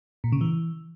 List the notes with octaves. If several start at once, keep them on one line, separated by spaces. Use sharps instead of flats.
A#2
C#3
E3